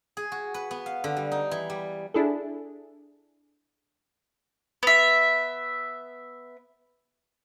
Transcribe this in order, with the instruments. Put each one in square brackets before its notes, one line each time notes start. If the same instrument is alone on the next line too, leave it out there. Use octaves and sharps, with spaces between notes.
[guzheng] G#4
F#4
B4
B3
F5
D3
G3
D#4
E3
G3
[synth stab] D4 E4 G#4 A4
[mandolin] B3 E5